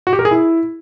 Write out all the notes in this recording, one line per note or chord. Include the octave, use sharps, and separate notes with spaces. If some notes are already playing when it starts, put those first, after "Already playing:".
F#4
G4
A#4
G#4
E4